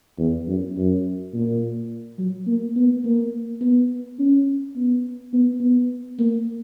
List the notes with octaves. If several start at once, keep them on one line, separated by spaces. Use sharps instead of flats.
E2
F#2
F#2
A#2
F#3
A#3
B3
A#3
B3
C#4
B3
B3
B3
A#3